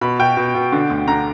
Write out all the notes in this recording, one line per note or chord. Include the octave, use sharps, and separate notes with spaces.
B2 B5
B2 G5
B2
B2
D3
D2
D3 A#5